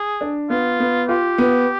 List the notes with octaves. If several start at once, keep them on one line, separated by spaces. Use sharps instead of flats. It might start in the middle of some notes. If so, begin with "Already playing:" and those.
Already playing: G#4
D4
B3 F4
B3
F4 G4
B3